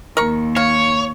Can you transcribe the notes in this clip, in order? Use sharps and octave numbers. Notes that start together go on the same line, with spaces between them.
D#2 A#4 C#6
C#5 F5